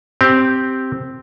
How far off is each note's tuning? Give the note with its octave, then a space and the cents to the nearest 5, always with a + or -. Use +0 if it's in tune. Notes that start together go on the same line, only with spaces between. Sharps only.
C4 +0 G4 -5